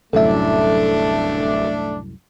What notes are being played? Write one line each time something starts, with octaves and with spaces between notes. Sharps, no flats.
D1 C2 F#2 A2 A3 D4 A4 E5